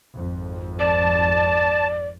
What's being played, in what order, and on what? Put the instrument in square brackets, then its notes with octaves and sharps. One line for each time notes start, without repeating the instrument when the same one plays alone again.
[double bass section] G#1 F2
[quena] D5 [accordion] A5